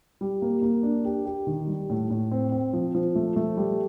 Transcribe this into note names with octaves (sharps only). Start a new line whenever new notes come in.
G3
A#3
A#3
D4
G4
G4
D#3
G3
A2
A2
C4
C4
F3
F3
A3
A3
G3